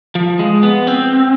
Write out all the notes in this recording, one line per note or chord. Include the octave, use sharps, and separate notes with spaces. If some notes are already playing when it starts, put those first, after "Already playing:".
F3
G#3
B3
C4